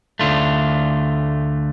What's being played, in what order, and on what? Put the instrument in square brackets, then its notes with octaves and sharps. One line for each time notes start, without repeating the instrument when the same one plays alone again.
[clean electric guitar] D2 D3 A3 F4